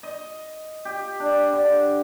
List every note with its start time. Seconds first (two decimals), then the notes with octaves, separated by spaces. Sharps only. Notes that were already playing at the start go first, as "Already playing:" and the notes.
0.03 D#5
0.85 G4
1.20 D4
1.53 D3